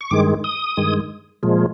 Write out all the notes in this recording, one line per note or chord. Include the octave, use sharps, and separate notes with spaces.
C#6
G2 D#3 G#3 D6
D#6
G2 D#3 G#3
A#2 F3 G#3